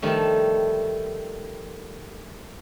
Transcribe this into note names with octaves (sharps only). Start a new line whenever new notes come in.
D#3 F3 G3 A3